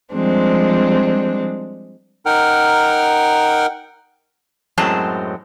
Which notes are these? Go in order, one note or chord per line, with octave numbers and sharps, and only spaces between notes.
F3 G3 G#3 C4 D4
D#4 A#4 F#5 G5 F6
F#2 A2 F#3 G#3 C4 A5